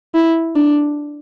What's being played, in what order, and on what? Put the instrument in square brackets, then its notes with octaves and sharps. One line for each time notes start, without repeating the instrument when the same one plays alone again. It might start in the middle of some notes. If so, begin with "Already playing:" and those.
[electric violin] E4
D4